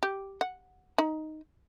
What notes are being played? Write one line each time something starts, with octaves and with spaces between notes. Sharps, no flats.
G4
F#5
D#4